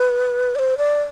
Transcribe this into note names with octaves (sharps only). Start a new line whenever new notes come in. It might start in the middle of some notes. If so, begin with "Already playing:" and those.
Already playing: B4
D5
C5
D5